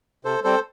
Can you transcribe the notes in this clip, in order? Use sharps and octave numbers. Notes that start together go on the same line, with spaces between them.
C3 A4 C5
G3 C4 A4 C5